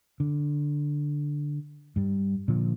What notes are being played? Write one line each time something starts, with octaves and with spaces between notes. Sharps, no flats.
D3
G2 G3
A#2 D3 F3